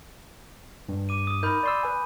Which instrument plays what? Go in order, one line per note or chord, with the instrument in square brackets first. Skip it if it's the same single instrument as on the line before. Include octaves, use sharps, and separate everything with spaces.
[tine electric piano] G2
[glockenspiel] D6 D#7
D#6
[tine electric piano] D#4 A#4 [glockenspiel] B5 G6
[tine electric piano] D5 C6 E6
B4 G#5